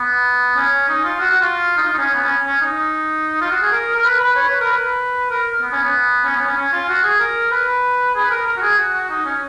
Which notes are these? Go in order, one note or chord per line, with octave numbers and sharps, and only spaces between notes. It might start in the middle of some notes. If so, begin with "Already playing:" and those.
Already playing: B3
C#4
D#4
F4
F#4
F#4
F4
D#4
F4
D#4
C#4
B3
C#4
C#4
D#4
F4
F#4
G#4
A#4
A#4
B4
B4
C#5
B4
A#4
B4
A#4
B3
C#4
B3
C#4
B3
C#4
C#4
F4
F#4
G#4
A#4
B4
G#4
B4
A#4
A#4
F#4
G#4
F#4
F#4
D#4
C#4